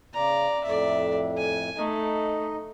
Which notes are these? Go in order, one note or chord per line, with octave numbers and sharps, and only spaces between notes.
C#3 D5 A#5
F2 A2 D5 E5
G#5
A3 D#4 D#5